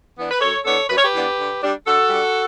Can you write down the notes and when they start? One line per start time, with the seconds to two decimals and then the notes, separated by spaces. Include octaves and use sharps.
0.16 E3 B3 D4
0.31 B4
0.40 F#2 A4 C#5
0.64 E3 B3 D4 A4 C#5
0.89 F#2 B4
0.96 C#5
1.03 G4 B4
1.13 E3 B3 D4
1.38 D3
1.62 G3 D4
1.86 D3 F#4 A4
2.10 G3 D4